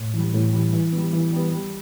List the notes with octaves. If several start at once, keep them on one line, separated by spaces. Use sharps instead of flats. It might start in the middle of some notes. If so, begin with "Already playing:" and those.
Already playing: A2
E3 G3
A2
E3 G3
E3
B3
G3
E3
G3 B3
G3